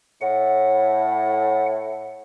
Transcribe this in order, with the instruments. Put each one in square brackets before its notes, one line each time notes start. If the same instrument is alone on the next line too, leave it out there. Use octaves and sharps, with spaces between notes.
[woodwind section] A2 [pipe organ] F#5